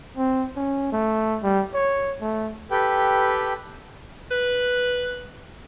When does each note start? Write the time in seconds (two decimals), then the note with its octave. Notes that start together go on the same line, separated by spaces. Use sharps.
0.17 C4
0.56 C#4
0.92 A3
1.43 G3
1.74 C#5
2.21 A3
2.71 G4 A4 B4 G5
4.31 B4